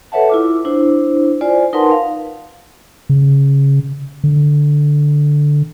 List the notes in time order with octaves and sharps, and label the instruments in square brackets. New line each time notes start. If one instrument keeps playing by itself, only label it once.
[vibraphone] A4 B4 C#5 E5 F#5 A5
E4 F4 D6
D4 E4 C5
F4 C5 D5 G#5
D#4 A#4 B4 F#5 A5 C6
F5
[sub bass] C#3
D3